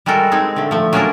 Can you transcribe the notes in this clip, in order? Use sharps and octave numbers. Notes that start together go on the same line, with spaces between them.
G3 G#3 F#4 A4 A#4
G#3 C4 D#4 G#4
D3 A3
F3 A3
F#3 C#4 D4 F4 G#4 A#4